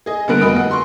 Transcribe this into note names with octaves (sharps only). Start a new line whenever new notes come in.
G#4 D#5
D3 G3 B3 A#4 F#6 D7
F1 F#4 D#5 B5 D#6 D7
F#5
C6 C#6